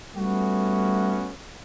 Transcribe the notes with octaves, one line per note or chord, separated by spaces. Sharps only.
G3 A3 B3 C#4 F#4